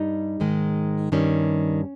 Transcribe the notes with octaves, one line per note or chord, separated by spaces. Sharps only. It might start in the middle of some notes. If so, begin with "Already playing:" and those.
Already playing: G2 G3 D#4
G#2 D#3 G#3
G2 D#3 G3 C#4